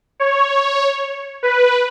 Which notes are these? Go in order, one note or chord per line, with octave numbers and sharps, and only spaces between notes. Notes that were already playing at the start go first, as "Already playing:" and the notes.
C#5
B4